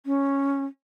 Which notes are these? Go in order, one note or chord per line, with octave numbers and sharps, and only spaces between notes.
C#4